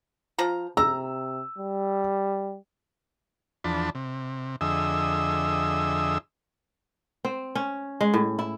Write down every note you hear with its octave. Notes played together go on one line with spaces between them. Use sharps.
F3 A#5
C3 A#5 E6
G3
E2 F3 D4 A5 B5
C3
F2 D3 G#4 D#5 E5 E6
C4
C#4
G#3
A2
E4